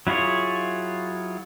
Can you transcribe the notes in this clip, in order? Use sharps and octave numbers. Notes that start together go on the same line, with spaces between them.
F#3 E4 F4 G#4 C#5